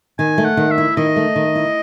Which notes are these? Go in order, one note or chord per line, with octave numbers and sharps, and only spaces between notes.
D#3 G#5
A3
F#5
D#3
E5
E4
D#3 D#5
A3
D#3
E4